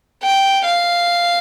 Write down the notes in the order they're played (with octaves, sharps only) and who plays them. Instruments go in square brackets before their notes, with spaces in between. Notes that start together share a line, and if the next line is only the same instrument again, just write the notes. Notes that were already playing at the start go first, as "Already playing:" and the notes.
[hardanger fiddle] G5
F5